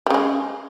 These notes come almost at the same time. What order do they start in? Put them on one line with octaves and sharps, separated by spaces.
G3 C#3 G#3